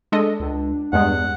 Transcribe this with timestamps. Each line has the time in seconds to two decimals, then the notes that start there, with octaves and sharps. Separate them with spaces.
0.12 G#3 D4 A4 D#5
0.40 C#2
0.93 E2 G2 G#3 F#5